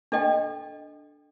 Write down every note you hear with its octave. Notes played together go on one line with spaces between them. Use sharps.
D4 A4 D#5 G5